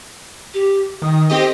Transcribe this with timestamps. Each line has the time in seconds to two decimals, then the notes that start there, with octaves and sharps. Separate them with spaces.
0.54 G4
1.02 D#3 D#6
1.29 C4 G4 A4 D#5